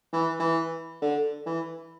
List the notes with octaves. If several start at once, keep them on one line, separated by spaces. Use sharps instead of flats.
E3
E3
D3
E3